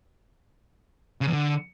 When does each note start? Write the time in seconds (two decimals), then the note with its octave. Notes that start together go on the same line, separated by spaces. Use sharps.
1.21 C#3
1.27 E2
1.33 D3